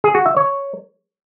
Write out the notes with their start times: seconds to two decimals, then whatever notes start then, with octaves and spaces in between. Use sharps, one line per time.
0.04 G#4
0.15 F#4
0.26 E5
0.37 C#5